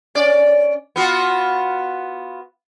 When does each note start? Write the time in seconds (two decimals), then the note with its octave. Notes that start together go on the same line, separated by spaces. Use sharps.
0.15 C#4 D5
0.96 B3 F4 F#4